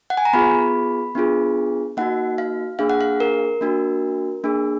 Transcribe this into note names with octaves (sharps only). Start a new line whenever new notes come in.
F#5
G#5
A#5
B3 F4 G#4 B5
B3 D4 F4 G#4
A#3 D#4 F#4 F#5
F5
A#3 D4 G#4 F5
F#5
F5
A#4
A#3 D4 F#4
A#3 D4 G#4